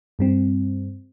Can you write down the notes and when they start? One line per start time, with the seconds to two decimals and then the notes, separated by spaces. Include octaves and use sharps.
0.19 G2 G3 C4